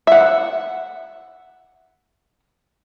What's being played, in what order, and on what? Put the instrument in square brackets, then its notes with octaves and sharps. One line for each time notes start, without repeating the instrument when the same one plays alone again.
[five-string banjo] E5 F#5